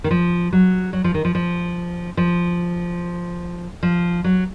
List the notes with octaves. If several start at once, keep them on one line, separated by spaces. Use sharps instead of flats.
D#3
F3
F#3
F#3
F3
D#3
F3
F3
F3
F3
F#3